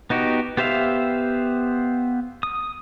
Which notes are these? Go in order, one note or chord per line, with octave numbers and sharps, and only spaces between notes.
B3 D#4 F#4 G4
B3 G4 C5 E5 F5
D#6